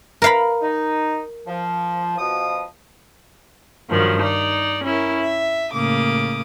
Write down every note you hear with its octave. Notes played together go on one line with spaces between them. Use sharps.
A#4 F5 B5
D#4
F3
B2 F3 D#6
G2 D#3 F3 F#3
D#4 D5
C#4 E4 A#4
E5
A2 C#3 A#3 D6 D#6